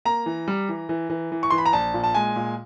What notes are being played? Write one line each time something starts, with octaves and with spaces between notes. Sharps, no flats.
A#3 A#5
E3
G3
E3
E3
E3
E3
C#6
E3 C6
B5
A#5
A#1 A5
A#2
A5
G#3 G#5
A#2